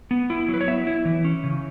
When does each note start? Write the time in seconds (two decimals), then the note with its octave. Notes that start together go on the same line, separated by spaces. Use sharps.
0.11 B3
0.30 E4
0.48 F#3
0.54 B4
0.61 C#5
0.68 B3 E5
0.87 E4
1.05 E3
1.25 C#4
1.44 C#3